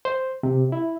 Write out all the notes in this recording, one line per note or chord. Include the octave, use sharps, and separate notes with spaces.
C5
C3
E4